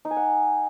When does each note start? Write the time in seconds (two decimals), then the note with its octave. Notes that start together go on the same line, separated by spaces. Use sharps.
0.05 D#4
0.11 G#5
0.16 F#5